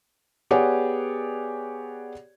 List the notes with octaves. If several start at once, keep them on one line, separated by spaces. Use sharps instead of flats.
B3 G4 G#4 C#5 D5 F#5